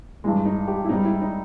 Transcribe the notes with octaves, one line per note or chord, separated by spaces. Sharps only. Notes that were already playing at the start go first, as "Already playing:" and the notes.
G2 E3 G#3
D#4
G4
E4
G#2 G3 D#4
E4
D#4